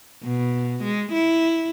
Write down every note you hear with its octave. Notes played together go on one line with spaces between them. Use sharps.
B2
G#3
E4